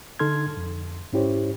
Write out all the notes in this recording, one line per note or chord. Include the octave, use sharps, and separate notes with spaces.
D3 D#4 A4 C6 F6 G#6
F2
G#2 C#4 E4 G4 C5 C#5